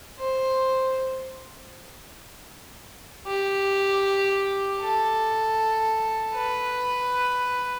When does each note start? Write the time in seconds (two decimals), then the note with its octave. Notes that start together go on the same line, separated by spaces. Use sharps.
0.19 C5
3.27 G4
4.81 A4
6.34 B4